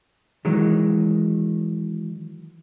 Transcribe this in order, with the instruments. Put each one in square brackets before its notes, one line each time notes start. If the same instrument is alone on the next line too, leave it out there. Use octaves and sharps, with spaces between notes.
[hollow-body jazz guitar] D#3 E3 F#3 G#3